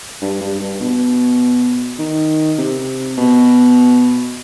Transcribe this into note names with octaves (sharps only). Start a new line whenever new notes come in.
G2
G2
G2
B2
D#3
C3
B2